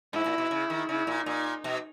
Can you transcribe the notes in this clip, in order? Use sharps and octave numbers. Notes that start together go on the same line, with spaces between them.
G#2 E4
A#2
B2
C#3
D#3
C#3 E4
A#2
A#2 D#4
B2